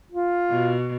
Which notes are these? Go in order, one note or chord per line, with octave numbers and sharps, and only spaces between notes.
F4
B2